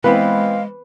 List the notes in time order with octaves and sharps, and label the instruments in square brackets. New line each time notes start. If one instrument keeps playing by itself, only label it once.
[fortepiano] E3 B3 C4 [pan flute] G#3 [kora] B4 [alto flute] F5